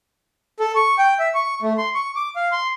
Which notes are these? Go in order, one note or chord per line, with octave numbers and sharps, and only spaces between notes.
A4
C#6
G5
E5
C#6
A3
C6
C#6
D6
F5
C6